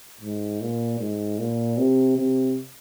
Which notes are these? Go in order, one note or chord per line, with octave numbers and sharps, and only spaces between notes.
G#2
A#2
G#2
A#2
C3
C3